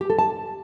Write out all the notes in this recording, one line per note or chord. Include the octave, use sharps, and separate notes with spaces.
G4
A4
A5